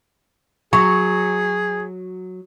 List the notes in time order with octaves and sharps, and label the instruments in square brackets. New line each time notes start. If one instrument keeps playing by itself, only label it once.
[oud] F#3 [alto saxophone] G#4 [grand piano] C#6